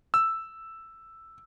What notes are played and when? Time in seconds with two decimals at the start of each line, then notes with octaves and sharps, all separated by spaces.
0.14 E6